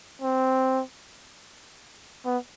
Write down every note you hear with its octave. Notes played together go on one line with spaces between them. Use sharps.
C4
B3